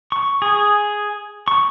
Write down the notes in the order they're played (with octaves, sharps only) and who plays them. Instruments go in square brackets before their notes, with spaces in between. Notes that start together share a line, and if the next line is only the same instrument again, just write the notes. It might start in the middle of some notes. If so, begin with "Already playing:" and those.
[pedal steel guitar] C#6
G#4
C#6